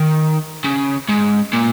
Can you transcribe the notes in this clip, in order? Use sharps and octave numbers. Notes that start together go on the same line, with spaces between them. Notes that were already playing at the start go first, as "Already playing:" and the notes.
Already playing: D#3
C#3
G#2
A#2